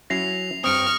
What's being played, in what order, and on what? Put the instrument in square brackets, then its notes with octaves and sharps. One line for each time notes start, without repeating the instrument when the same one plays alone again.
[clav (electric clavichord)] F#3 C#4 E4 [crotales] A#6 C7 F7
[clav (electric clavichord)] G2 C4 [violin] C#6 F6 [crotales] D#6 D7